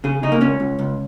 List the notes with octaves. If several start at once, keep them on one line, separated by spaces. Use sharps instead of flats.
C#3 G#4
C#3 D#4
A#3
C#2 C#4
C#2
C#2